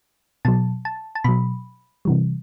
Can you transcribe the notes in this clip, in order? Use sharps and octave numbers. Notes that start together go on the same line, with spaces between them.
B2 F#3 A5
A5
A5
B2 F#3 B5
C3 E3 G3